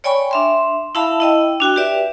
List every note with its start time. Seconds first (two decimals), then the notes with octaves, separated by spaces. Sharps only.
0.04 C#5 D5 G5 G#5 B5 C#6
0.31 D4 E5 C6
0.95 E4 E5 F5 A5 B5
1.20 E4 D#5 G5
1.60 D4 F#4 G5
1.76 G4 B4 D5 E5